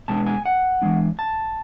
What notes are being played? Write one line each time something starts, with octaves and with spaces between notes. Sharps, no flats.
B2 G#3 B3 D4 A5
G#5
F#5
E3 G#3 D4
A5